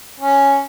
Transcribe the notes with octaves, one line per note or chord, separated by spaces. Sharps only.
C#4